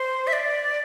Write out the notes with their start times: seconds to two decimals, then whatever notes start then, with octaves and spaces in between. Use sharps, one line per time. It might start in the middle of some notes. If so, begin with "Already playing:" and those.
Already playing: C5
0.27 E5
0.33 D5